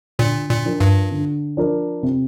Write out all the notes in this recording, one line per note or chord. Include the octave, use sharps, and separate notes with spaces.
A#2 D3
A#2
F3 D4 F4 A#4
G2
D3
F3 D4 F4 A#4
C3